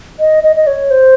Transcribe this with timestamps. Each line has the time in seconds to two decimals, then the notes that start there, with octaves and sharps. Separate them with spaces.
0.20 D#5
0.44 D#5
0.56 D#5
0.67 C#5
0.91 C5